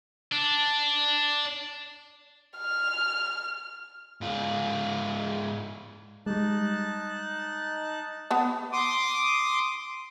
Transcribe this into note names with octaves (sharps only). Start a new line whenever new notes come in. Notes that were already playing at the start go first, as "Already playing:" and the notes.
D4
F6
G#2 F4
G3 G#3 D#4 A5 F#6
B3 A5
C6 D6 D#6